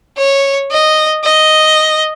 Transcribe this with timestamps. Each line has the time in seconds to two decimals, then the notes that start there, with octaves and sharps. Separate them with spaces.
0.17 C#5
0.71 D#5
1.24 D#5